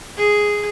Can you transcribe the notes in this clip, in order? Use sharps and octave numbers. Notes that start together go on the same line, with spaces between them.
G#4